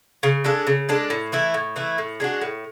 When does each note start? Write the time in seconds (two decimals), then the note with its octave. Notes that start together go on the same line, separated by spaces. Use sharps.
0.23 C#3
0.44 G#3 D4 A4
0.67 C#3
0.89 G#3 D4 A4
1.10 A2
1.32 E3 A3 E4
1.54 A2
1.76 E3 A3 E4
1.98 A2
2.20 G#3 D4 F#4
2.42 A2